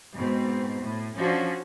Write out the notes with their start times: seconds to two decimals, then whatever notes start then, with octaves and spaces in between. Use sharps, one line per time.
0.16 G#2 B2 C4
0.82 A2
1.18 F3 C#4 D4 F#4